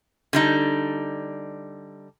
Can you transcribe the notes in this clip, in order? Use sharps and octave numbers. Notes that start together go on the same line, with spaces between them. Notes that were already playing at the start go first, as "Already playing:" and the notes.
D3 G3 D#4